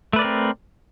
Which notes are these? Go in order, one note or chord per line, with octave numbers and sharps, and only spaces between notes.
A3 C4 A#4 B4 D5